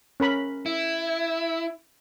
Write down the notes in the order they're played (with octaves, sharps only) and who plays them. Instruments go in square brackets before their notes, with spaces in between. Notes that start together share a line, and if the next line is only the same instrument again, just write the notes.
[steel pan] C#4 A#4 B5
[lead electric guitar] E4